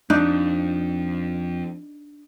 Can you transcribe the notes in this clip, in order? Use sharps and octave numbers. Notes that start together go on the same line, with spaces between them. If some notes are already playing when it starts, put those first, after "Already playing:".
F2 D4 D#4